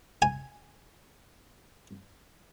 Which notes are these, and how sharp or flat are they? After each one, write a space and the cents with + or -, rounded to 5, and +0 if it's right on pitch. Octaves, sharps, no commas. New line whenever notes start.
G#5 -5